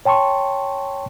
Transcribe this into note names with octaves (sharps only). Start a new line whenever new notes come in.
C#5 G5 A5 C6 C#6